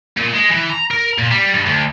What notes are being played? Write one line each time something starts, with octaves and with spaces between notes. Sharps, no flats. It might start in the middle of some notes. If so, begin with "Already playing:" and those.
A#2
G#3
E3
A#5
A#4
A#2
G3
G2
D2